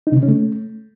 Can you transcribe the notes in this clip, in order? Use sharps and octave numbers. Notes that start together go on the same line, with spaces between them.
D#4
C3
C#3
C#4
A3